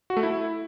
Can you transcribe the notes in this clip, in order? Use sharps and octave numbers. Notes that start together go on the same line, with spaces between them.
F#4
A3
E4